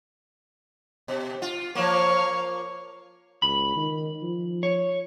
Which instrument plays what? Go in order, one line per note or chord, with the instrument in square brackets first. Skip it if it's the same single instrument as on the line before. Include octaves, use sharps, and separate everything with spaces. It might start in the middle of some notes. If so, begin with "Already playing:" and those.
[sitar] B2
F4
[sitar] F3 A#3 [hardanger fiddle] C#5 F5
[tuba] C#2 [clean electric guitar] B5
[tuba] D#3
F3
[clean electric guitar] C#5